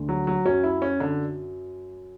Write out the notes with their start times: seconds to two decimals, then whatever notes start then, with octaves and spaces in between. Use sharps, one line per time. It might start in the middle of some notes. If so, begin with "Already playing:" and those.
Already playing: D2 D3
0.09 F#3
0.27 F#3
0.45 F#2 F#3 C#4
0.64 E4
0.82 C#4
1.00 D3